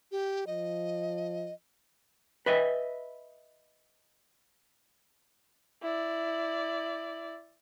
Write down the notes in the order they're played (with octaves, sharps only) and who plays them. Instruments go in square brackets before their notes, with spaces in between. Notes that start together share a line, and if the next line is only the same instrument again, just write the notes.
[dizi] G4
[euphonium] F3 [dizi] D#5
[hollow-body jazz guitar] B4 D#5 E5
[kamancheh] E4 D5